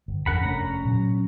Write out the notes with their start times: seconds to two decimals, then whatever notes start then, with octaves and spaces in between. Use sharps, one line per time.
0.08 G1
0.26 E2 C#4 A#4 F#5 B5
0.43 F1 A3 C#4 D4 A#5
0.85 A#2 F#3